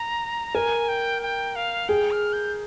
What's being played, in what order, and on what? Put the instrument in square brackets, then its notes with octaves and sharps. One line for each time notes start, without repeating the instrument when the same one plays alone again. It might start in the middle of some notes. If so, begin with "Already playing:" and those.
Already playing: [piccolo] A#5
[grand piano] A#4 [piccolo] G#5
[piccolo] G5
G5
F5
[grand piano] G#4 [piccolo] G5
[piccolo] F6
G6